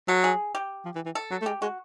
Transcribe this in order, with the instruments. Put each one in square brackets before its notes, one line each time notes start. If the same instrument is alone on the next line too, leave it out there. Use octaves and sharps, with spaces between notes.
[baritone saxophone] F#3 [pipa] A4
[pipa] G#4
G4
[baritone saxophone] F3
E3
E3
[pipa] A4
[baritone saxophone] F#3
A3
[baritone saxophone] G#3 [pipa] G4
[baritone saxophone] G#3 [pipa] F#4